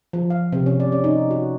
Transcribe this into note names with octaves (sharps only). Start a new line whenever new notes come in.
F3
F5
C3
C#4
D5
C#4
D#4
F#4